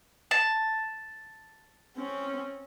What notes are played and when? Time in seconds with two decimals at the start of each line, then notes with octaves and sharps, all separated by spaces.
0.31 A5
1.97 C4 C#4